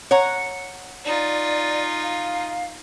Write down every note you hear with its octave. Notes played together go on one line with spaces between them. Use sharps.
C#5 F#5 A#5
D#4 F4 D5
F5